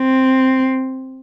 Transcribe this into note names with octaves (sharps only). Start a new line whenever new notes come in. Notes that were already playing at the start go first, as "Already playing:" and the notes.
Already playing: C4